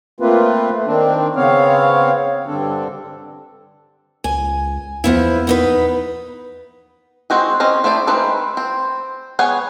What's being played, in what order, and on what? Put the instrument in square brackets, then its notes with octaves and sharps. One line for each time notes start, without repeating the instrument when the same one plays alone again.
[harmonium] A3 A#3 C4 F4 B4
A3
D#3 C4 D4
C#3 B3 C4 C#5 F5
G2 D3 C4 D4 A4
[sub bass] C#2 [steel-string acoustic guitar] G#5
[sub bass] E2 [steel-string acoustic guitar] F3 B3 E4
[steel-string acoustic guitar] B3 D#4 B4
[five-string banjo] G#3 C4 F#4 G#4
C4 C#4 D#5
A3 C4 E4 C5 D5
D#3 G#3 C4 B4
C4
B3 G#4 C#5 F#5 G#5